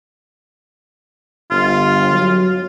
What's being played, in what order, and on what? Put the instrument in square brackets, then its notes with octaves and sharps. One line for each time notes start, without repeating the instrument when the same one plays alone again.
[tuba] G1 [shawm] F4
[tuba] F#3